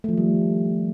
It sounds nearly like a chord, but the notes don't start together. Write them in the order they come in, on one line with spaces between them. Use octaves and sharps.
A3 F3 D#3 G3